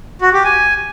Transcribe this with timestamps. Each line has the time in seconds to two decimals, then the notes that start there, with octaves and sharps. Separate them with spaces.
0.21 F#4
0.33 G4
0.45 G#5